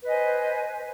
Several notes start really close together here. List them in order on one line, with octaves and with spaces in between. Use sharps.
B4 D#5 G#5 C5